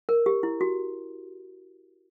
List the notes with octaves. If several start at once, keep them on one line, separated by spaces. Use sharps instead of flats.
A#4
G4
E4
F#4